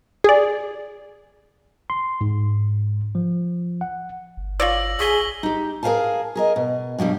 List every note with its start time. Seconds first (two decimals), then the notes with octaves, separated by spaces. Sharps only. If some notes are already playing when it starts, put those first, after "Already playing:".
0.24 G#4 D5
1.90 C6
2.21 G#2
3.15 F3
3.81 F#5
4.37 G1
4.60 F4 C#5 D5 E6 A#6 F#7
5.00 A#1 G#4 C#6 B6 G7
5.43 D#4 G4
5.83 G#4 A#4 D5 F5 G#5 A5
6.36 G#4 A#4 D#5
6.56 B2
6.98 G2 B2 F#3 G3